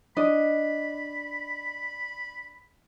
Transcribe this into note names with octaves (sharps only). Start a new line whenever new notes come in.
D4 D#5 B5